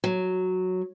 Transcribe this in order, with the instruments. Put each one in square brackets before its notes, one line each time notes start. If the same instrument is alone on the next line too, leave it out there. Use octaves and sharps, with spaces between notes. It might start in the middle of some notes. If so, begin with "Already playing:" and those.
[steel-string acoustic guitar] F#3